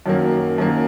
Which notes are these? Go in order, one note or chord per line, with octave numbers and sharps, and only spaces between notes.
F#2 D#3 F#3 A#3
F#2 D#3 F#3 A#3